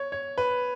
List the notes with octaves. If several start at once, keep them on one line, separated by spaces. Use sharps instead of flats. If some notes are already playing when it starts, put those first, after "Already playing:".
Already playing: C#5
C#5
B4